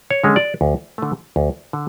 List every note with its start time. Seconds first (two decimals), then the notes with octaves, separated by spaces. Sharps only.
0.11 C#5
0.24 D3 G#3 C#4
0.36 D5
0.61 D2
0.98 D3 A3
1.36 D2
1.73 D3